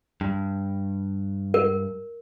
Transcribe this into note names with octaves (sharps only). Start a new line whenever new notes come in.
G2
A#4